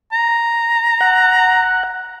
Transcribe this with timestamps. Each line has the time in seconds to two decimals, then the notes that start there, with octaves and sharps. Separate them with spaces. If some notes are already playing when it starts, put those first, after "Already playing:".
0.12 A#5
1.01 F#5